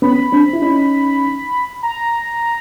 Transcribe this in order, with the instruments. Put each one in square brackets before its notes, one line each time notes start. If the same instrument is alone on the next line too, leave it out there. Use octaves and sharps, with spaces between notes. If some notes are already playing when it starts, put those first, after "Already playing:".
[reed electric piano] B3 C#4 [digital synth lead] B5
[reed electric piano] C4 D4
E4
C#4 D#4
[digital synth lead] A#5